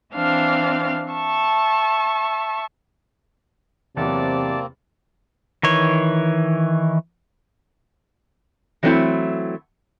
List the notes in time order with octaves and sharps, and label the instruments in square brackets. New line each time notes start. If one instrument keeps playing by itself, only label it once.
[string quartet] E3 C4 D4 F5 F6
E5 A5 C#6
[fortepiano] E2 F#3 [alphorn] C3 [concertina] A#3 C4 [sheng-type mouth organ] D5 A5
[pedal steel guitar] D#3 E3 C#5
[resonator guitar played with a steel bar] E3 F#3 A3 B3 C4 E4